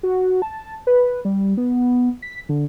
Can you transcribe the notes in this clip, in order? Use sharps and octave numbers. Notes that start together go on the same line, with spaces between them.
F#4
A5
B4
G3
B3
B6
D3